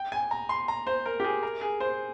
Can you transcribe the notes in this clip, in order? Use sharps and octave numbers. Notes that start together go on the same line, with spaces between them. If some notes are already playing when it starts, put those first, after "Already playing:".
Already playing: G5
G#5
A#5
C6
A#5
C5
A#4
G4
G#4
A#4
G#4
C5